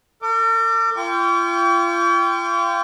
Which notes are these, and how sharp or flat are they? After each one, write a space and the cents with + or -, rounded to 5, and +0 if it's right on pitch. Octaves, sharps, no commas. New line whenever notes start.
A#4 -45 D6 +0
F4 -35 G5 +0 C#6 +45